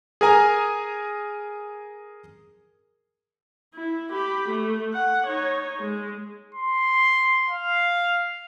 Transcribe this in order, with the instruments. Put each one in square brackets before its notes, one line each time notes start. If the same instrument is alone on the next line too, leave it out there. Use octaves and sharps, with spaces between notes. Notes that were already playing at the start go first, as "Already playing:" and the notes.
[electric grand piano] G#4 A#4 G#5 A#5
[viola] E4
G4 B5
A3
F#5
D#4 C#5
G#3
[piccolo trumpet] C6
F5